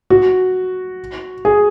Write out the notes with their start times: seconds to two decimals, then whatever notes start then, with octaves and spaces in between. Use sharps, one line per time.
0.10 F#4
1.45 G#4